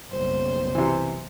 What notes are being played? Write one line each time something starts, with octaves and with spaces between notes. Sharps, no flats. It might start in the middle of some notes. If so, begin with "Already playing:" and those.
F#1 B1 G3 C5
C3 E3